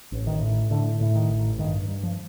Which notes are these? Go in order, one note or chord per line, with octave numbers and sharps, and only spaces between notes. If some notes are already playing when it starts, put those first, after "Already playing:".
A1
D#3
A2
A2 D3
A2
D#3
A1
G2 D#3
G2
F3